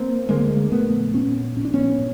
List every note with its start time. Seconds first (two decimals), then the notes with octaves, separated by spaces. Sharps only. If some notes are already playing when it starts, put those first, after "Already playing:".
Already playing: A#3 C4
0.29 D2 D3 G#3 A#3
0.71 A#1 A3 B3
1.14 A#2 B3 C#4
1.56 A#1 C#4
1.65 D4
1.73 B3 C#4
1.99 A#2